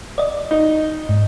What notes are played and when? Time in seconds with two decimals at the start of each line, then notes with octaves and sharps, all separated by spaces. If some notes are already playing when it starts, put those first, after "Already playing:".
0.18 D5 D#5
0.51 D#4
1.09 G#2